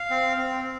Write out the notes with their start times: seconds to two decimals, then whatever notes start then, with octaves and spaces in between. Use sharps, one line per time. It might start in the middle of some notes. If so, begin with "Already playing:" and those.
Already playing: F5
0.10 C4
0.38 C4